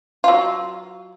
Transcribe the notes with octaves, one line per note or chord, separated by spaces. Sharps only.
F#3 F4